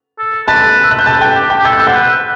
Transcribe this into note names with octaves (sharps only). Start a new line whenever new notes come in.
A4
B4 A5 A6
E6
F#6
G6
B4 A5 A6
G5 G6
G4
G5 G6
G4
A4 G6
F#6
E6
C5 F#5 F#6
B4